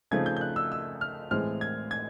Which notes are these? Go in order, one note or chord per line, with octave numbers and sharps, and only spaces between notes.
C#3 F3 A3 C4 D#4 G#6
G6
G6
F#6
E6
E6
F6
A2 E3 G#3 C4 F6
G#6
G#6